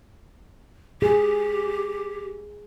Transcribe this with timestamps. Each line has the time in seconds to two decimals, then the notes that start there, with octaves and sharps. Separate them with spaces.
1.02 G4 G#4